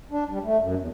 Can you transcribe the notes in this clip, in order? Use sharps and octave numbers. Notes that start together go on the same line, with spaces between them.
D4
G3
A3
F#2
E2